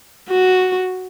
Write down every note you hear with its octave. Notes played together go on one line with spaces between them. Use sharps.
F#4